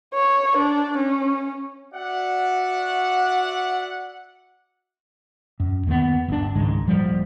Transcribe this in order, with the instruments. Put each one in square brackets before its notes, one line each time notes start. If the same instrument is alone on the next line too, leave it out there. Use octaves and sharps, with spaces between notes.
[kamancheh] C#5
D4
C#4
[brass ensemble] F#4 D5 E5 F#5
[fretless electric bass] F#2
D#2 D#3 B3
G1 D4
C#2 G#2 D#3 G#3
D#1 F3 G3